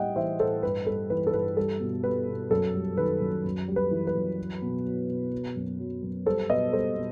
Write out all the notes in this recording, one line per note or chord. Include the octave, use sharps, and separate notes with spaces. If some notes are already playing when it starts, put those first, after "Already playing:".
Already playing: A2 G3 D#5 E5 F#5 G5
E3 C5 E5
A2 A4 C5
G2 B4
G3 A4
E3 B4
A4
G2 B4
G3 A4
B2
G3 B4
B2
F#2 A4
G3
D#3 B4
F#2
F#2
G3
B4
E3
B4
F#2
F#3
B2
F#3
B2
F#3
F#2
F#3
F#2
G3 A4 C5
B2 B4 D#5
G3 A4 C5
B2